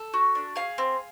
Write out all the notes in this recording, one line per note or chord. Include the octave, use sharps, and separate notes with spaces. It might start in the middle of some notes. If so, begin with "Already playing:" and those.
Already playing: A4
F#4
D4
G#4 F5
C4